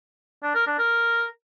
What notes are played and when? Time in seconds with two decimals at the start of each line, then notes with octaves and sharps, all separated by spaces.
0.43 D4
0.55 A#4
0.67 D4
0.79 A#4